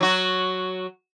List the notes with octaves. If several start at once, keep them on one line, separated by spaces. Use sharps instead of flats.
F#3 F#4